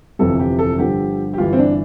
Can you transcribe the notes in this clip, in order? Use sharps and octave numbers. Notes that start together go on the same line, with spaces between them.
G1 F2 C3 E3 A4
G4
A4
G1 G2 D3 F3 G4
G4
G1 G2 E3 F4
C4
D4